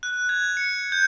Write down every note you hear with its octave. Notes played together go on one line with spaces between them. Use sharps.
F#6
G#6
C#7
G6